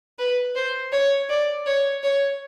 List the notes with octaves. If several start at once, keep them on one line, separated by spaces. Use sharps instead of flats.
B4
C5
C#5
D5
C#5
C#5